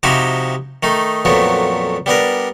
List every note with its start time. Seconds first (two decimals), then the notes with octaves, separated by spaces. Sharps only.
0.03 C3 F3 D#4 E4 F#4 G4
0.83 D#3 A3 D#4
1.25 F2 A#2 F#3 A3 B3
2.06 G3 B3 D4 A#4